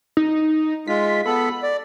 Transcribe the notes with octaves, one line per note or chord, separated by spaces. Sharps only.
D#4
G#3 F4 B6
B3 A4 B5
D5